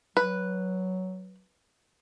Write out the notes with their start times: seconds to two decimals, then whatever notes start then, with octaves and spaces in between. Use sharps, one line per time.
0.17 F#3 B4